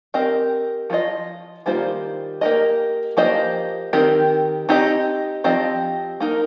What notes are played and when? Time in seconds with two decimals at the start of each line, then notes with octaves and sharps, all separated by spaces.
0.14 C4 G4 A#4 D#5
0.90 F3 A#3 F4 D#5
1.66 D#3 G3 A#3 F4 C5
2.41 A#3 G4 A#4 D#5
3.17 F3 A#3 G4 C5 D#5
3.93 D#3 C4 G4 A#4
4.69 C4 D#4 G4 D#5
5.44 F3 C4 G4 D#5
6.20 A#3 D#4 A#4